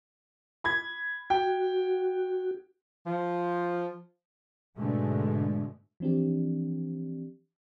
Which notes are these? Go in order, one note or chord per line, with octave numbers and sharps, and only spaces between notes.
B5 G#6
F#4 G5
F3
G#2 B2 D3 G#3 A3
E3 F3 C4 D4 G4